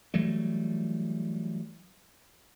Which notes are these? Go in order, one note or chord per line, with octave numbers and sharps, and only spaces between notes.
E3 F#3 G3 A3